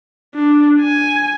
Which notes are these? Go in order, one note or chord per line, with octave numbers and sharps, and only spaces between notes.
D4
G#5